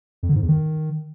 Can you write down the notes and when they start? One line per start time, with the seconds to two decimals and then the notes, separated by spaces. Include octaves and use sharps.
0.23 F2
0.29 D3
0.36 G#2
0.42 E2
0.48 D#3